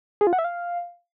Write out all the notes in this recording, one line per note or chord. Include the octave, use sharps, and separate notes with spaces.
G#4
F4
F#5
E5
F5